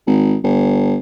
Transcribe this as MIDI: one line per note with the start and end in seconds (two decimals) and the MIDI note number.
0.07 0.36 32
0.44 0.97 31